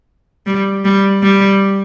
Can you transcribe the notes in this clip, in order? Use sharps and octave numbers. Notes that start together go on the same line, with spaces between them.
G3
G3
G3